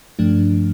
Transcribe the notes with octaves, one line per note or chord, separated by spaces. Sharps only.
G2 F3 A3 D4